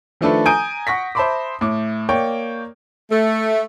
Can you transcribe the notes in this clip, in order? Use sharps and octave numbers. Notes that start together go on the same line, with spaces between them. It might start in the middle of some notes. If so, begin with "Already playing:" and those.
D#3 F3 A3 D4 A4 B4
G#5 A#5 D#6 G6 D7
F#5 C#6 A#6 B6
C5 E5 A5 B5 C6 D6
A2 D6
A#3 C#5 D5 G5
A3